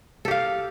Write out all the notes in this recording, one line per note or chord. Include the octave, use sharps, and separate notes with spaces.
G4 A4 F5